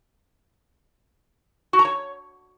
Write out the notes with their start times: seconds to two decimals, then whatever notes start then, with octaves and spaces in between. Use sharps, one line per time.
1.73 F#4
1.79 A#5
1.85 C#5